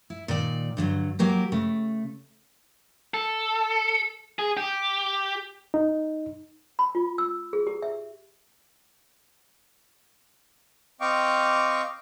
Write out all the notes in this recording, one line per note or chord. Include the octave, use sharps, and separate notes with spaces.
E4
A#2 D#3 D5
G2 D3 F3 F#3
F#3 A#3 G4 A#4
C#3 A3
A4
G#4
G4
D#4
B5
F4
E6
G#4
G4
E5
C4 D#5 F5 G5 C#6 D6